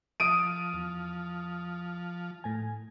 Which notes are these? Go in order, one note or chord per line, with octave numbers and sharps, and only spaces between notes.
F3 D#6 D7 D#7
E2
A2 G#5